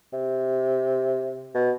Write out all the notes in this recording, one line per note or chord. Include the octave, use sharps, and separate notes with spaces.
C3
B2